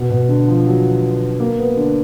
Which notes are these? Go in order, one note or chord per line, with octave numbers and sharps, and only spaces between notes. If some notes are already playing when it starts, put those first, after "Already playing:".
Already playing: B2
B2
D3
F3
F#3
A#3
B3
D3